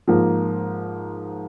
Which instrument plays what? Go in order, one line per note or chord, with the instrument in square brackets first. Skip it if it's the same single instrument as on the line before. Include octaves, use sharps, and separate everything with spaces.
[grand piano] G#2 F3 A#3